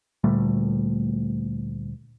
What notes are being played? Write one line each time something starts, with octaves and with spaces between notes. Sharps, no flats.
D2 A#2 G3 A3